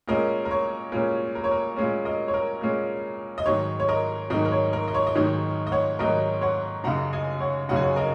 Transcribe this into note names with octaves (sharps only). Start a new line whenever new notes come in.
A#2 G#3 C#4 A#4 D#5
A#4
C#5
A#2 G#3 C#4 A#4
A#4
C#5
A#4
A#2 G#3 C#4
A#4 D#5
C#5
A#4
A#2 G#3 C#4
D#5
G#2 D#3 F#3 D#4 C#5
C#5
A#4 D#5
G#2 D#3 F#3 D#4 A#4 D#5
A#4
C#5
A#4
D#5
C#5
D#5
G#2 D#3 F#3 D#4 C#5
D#5
C#5 F#5
G#2 D#3 F#3 D#4 A#4 D#5
C#5 F#5
F#2 C#3 F#3 D#4 F#5 A#5
D#5 G#5
C#5 F#5
F#2 C#3 F#3 D#4 F#5
G#5
C#5 F#5
A#4 D#5